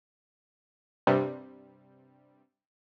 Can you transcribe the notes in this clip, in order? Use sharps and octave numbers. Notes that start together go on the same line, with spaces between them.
G2 C3 G3